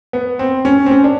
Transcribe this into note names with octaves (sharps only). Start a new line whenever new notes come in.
B3
C4
C#4
C4
C#4
D4